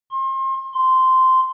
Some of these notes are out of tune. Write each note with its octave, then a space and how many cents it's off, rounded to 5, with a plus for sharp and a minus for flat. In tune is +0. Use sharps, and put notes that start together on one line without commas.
C6 +35
C6 -10